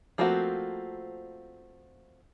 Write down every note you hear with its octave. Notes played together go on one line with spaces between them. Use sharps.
F3 A3 A#3 C4 F#4